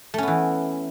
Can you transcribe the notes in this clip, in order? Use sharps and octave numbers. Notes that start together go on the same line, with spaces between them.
E3 A3 B3 C#4